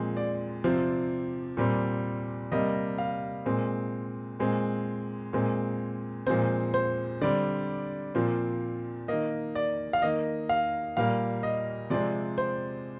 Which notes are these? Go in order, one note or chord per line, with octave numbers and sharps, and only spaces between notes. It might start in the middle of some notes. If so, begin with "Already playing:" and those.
Already playing: A#2 F3 G#3 C4
D5
C3 F3 C4
A#2 G3 C4
C3 G3 A#3 D#5
F5
A#2 G#3 C4
A#2 G#3 C4
A#2 G#3 C4
A#2 F3 G#3 C4 C5
C5
D3 G3 C4 D5
A#2 F3 C4
D#3 A#3 D#5
D5
F5
D#3 A#3 D#5
F5
A#2 G3 A#3 F5
D#5
C3 F3 G#3 C4 D5
C5